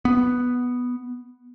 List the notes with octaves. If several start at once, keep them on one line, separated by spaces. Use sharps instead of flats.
B3